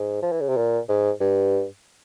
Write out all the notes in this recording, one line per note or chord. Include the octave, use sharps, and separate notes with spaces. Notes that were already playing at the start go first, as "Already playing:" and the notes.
Already playing: G#2
F3
E3
C#3
C3
A#2
G#2
G2